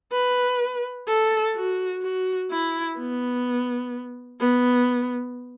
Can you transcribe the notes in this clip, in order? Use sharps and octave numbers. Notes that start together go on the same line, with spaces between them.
B4
A4
F#4
F#4
E4
B3
B3